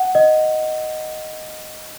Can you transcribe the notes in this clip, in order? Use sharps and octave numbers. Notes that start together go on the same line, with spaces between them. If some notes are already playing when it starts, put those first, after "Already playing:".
Already playing: F#5
D#5